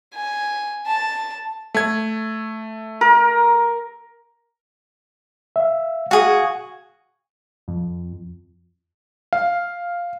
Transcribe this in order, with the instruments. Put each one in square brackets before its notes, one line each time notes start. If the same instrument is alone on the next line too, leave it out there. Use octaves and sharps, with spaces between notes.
[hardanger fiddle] G#5
A5
[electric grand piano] A3 G#6
[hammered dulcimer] A#4
[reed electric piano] E5 F5
[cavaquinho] F#4 G#4 [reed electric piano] F5
[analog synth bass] F2
[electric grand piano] F5